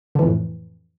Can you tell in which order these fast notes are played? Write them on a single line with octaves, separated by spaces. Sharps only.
D3 E3 F2 A2